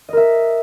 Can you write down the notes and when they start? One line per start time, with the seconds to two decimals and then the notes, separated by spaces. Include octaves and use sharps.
0.09 D#5
0.13 A#4
0.17 E5